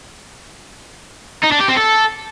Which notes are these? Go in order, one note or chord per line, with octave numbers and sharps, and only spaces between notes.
D#4
D4
G4
C4
A4